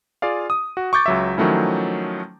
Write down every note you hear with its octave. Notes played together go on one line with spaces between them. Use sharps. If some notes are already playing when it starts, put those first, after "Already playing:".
F4 G#4 D5 F5
D#6
F#4
C#6 D6 G6 A6
C#2 F#3 E5
D#3 F3 F#3 A3 C#4 E4